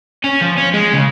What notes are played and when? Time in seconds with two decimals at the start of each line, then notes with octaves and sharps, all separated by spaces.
0.24 C#4
0.41 F3
0.57 C#4
0.73 G#3
0.93 C#3